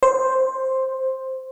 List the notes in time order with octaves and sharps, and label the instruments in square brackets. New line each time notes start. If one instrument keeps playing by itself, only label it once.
[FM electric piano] C5